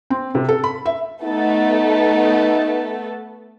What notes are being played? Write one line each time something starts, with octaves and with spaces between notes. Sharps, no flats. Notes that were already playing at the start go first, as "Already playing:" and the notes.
C4
C3
A4
B5
E5
A3 B3 D#4 A4